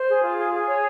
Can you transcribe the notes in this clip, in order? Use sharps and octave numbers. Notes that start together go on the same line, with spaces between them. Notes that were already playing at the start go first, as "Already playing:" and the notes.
Already playing: C5
G#4
F4
G#4
G#4
C#5